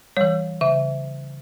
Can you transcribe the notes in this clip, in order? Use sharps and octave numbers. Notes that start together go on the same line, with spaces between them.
E3 G3 C#5
C#3 E5